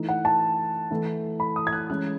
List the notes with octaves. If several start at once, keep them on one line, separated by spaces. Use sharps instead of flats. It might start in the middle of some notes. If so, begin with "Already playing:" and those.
Already playing: E3 A3 D#4
F#5
A5
E3 A3 E4
B5
D#6
G#6
F#6
E3 G#3 C#4 E4 F#6